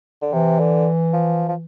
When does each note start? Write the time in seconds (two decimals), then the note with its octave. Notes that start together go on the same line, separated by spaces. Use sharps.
0.22 D3
0.32 C3 E3
0.59 D3
1.14 F3
1.48 F3